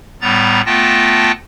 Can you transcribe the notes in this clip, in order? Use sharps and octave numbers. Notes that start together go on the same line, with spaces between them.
A2 G3 B3 A#5 A6
A3 B3 F4 G5 A5 A#6